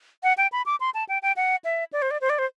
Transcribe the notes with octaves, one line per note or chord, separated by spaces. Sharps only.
F#5
G5
B5
D6
C6
A5
G5
G5
F#5
E5
D5
C5
D5
C5
D5
C5